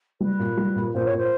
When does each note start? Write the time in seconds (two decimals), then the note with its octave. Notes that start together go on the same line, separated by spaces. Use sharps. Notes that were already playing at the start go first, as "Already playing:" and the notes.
0.20 G3 B4
0.39 A#2
0.57 G3
0.76 A#2
0.94 A#2 C5
1.05 C#5
1.12 A#2 C5